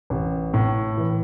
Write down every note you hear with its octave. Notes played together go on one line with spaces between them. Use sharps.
A1
A2
E3